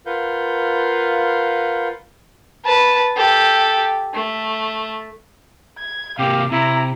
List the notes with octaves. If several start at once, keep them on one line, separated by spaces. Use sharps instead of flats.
F4 A#4 B4 F5 F#5 G6
B4 A5
G4 A4
A3
G#6
C3 A#3 G4 F5
C3 E4 A#5